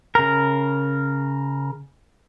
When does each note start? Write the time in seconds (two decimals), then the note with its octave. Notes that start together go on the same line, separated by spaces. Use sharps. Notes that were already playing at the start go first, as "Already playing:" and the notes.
0.15 C#3 A#4